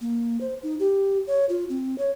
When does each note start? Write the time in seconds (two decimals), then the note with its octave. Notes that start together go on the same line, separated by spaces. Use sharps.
0.01 A#3
0.41 C5
0.63 D#4
0.80 G4
1.27 C#5
1.49 F4
1.69 C4
1.98 C#5